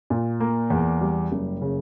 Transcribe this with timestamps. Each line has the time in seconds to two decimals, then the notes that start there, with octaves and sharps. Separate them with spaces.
0.10 A#2
0.40 A#3
0.70 E2
1.01 G3
1.32 F#1
1.62 C#3